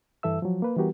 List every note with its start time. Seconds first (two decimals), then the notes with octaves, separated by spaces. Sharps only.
0.23 G2 E3 A4 E5 E6
0.42 F3 F#3
0.62 A#3 B4
0.77 E3 G3 B3 F#4 G4 A#4